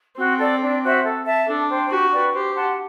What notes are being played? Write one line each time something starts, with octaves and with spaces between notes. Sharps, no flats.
C4 F#4
A4 D5
D4
F#4 C5 E5
A4
E5 A5
D4 A4
C5 G5
F#4 G4
B4 D5 G5
G4 C5
F#5 A5 C6